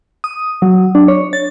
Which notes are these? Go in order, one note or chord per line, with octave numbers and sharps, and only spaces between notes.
D#6
F#3
D4
C#5
A6